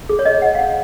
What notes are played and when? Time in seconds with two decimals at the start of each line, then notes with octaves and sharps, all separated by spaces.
0.09 G#4
0.19 C#5
0.25 D#5
0.42 F#5
0.55 F5
0.59 F#5